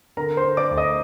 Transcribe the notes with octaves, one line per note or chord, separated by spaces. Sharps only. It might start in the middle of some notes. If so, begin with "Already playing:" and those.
D3 A#4 A#5
C5 C6
D3
D5 D6
D2
D#5 D#6